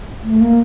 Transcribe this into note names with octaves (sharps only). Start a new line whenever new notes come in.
A3
A#3